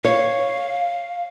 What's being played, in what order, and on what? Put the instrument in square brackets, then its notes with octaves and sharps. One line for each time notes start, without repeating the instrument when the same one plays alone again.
[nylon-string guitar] C#5 [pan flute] F5